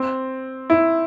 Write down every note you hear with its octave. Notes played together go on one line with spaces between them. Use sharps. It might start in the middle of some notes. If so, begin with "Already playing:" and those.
Already playing: C4
E4